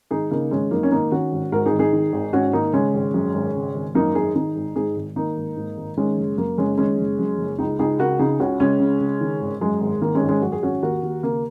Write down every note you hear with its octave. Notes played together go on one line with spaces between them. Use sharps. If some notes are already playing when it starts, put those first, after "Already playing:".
G#1 D#4 G#4
C#3 A#3 D#4
G#1 G#3 C#4
F#2 A#3 D#4
C#4
G#1 A#3 D#4
D#3 C#4 F#4
G#1
G#2 F#4 A#4
D#4 G#4
G#1
D#4 G#4
D#3
G#1
G#2 C#4 F#4
G#1 A#3 D#4
C#3 G#3 C#4
G#1
F#2
G#1
C#3
G#1
F#2 A#3 D#4
G#1 D#4 G#4
D#3 D#4 G#4
G#1
G#2 D#4 G#4
G#1
D#3 A#3 D#4
G#1
G#2
G#1
D#3 G#3 C#4
F#1
F#2 A#3
F#1 G#3 C#4
D#3 G#3 C#4
F#1
F#2
F#1
C#2 D#4 G#4
C#2 D#4 G#4
C#3 F#4 A#4
C#3 D#4 G#4
C#2 C#4 F#4
C#2 G#3 C#4
C#3
C#3
D#3
G#1
F#2 G#3
G#1
D#3 A#3
G#3 C#4
G#1
G#3 C#4
F#2 F#4
G#4
G#1 C#4 F#4
D#2 F#4 A#4
D#2
C#3 A#3